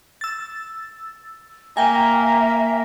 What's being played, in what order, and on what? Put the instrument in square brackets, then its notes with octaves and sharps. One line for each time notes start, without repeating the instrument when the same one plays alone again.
[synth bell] E6 A6
[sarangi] A#3 [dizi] E5 [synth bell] G5 G#5 [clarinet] A#5